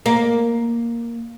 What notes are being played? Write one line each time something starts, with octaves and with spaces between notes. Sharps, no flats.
A#3